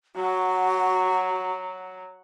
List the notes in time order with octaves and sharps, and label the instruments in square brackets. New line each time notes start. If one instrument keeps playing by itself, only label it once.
[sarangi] F#3 [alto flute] F#4